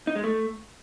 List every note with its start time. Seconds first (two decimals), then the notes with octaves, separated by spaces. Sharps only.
0.07 D#4
0.16 G#3
0.24 A3